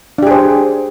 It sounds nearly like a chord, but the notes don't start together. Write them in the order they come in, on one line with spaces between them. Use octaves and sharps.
D4 G4 G#4 C5